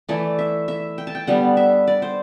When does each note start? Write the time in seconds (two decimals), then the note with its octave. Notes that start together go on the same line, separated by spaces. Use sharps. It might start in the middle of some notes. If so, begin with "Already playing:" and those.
0.09 E3 A3 E4 D5
0.39 E5
0.68 E5
0.98 G5
1.07 A5
1.15 G5
1.27 D3 G3 B3 F#5
1.57 E5
1.87 D5
2.02 C5